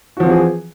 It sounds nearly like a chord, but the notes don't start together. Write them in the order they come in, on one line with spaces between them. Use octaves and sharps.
F#4 F3 C4 E3 G#4